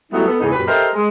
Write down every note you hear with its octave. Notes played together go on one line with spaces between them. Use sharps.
F#3 G3 A3 B3 D#4 E4
B3 A4
E2 G#2 C#3 D#4
F#2 A#2 G4 B4
G4 A4 A#4 C5 D#5 E5
G#3